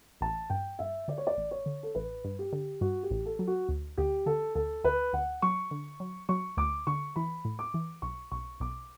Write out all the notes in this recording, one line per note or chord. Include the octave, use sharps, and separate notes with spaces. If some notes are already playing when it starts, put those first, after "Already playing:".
A1 A5
G2 G5
G2 E5
D3 D5
C#5
D5
A1
C#5
D3
A4
A1 B4
G2
G4
D3
G2 F#4
G4
A1
A4
F#3
F#4
D2
D2 G4
D3 A4
D2 A4
D2 B4
D2 F#5
F#3 C#6
D3
F#3
F#3 C#6
D2 D6
D3 C#6
E3 B5
A2
D6
E3
B1 C#6
B1 C#6
B1 D6